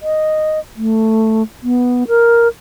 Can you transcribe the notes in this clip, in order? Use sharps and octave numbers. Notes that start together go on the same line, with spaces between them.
D#5
A3
B3
A#4